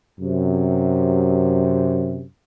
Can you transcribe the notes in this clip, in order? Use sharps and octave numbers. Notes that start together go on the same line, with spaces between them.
F#2 C3